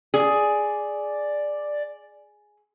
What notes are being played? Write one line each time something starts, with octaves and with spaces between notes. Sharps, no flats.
G#4 D5